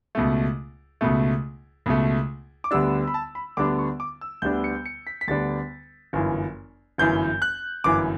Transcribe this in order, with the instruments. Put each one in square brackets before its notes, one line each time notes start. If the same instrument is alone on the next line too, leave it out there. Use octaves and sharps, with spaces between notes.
[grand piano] C#2 B2 A3
C#2 B2 A3
C#2 B2 A3
D6
D2 D3 G3 B3 D4 E6
B5
A5
B5
D2 D3 G3 B3 D4 D6
C#6
D6
E6
D2 D3 G3 B3 D4 G6
C#7
C#7
B6
B6
D2 D3 G3 B3 D4 A6
G1 F#2 E3
G1 F#2 E3 G6
F#6
G1 F#2 E3 D6